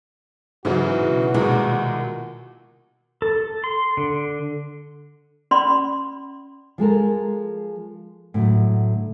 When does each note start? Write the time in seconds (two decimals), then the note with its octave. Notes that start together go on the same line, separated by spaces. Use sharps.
0.65 G#2 C#3 E3 F#3 F#4
0.97 B2
1.34 C2 A#2 D#3 G#3 A#4
3.22 A4
3.64 C6
3.97 D3
5.51 C#4 D5 B5 C6
6.78 F3 G#3 A4 A#4
8.34 A2 D3 F#3